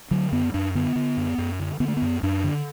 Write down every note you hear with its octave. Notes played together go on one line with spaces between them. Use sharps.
D3 F#3
F#2 B3
F#2 D4
D3 B3
D3
F#2
F#2
D3
D3 B3
A3
B3
F#2
F#2 D4
D3